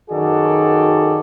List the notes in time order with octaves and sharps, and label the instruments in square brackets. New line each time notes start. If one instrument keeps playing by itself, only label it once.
[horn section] F#2 D#3 F#4 G#4 A4 D5